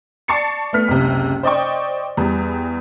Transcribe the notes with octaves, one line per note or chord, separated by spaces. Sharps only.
D5 A5 C#6 A6 C7 C#7
A3 B3 F6 B6
F#1 C#2 C3
C5 D5 D#5 G5 C#6
E2 G3